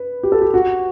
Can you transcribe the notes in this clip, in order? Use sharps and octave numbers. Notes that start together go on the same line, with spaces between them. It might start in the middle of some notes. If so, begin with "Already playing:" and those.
Already playing: B4
G4
A4
G4
F#4